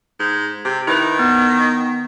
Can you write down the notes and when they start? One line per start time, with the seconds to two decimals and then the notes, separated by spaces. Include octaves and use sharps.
0.19 G#2
0.65 C3
0.87 D#3 E4 B4
1.19 B3